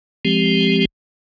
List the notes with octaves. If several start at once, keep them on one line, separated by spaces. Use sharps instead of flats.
F3 G#3 C4 G4